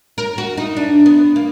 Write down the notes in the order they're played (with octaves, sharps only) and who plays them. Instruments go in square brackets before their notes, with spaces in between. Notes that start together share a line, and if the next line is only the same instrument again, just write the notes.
[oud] A#4
F#4
D#4
D4
B3
A#3